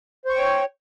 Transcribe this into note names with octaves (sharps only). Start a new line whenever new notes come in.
C5 C#5 G5 C#6